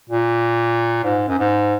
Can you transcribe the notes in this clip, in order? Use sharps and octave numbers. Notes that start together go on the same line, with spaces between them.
A#2
G#2
F#2
G#2